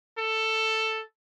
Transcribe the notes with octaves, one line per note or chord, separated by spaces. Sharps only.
A4